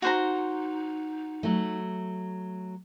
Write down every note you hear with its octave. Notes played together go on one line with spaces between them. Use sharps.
D#4 F#4 C5 A#5
F#3 A3